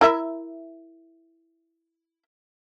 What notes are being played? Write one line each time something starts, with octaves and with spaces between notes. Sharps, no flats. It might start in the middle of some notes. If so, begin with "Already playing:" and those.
E4 A#4 E5